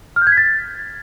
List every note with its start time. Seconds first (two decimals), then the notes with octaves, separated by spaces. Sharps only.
0.16 F6
0.22 G6
0.27 G#6
0.32 B6
0.37 A6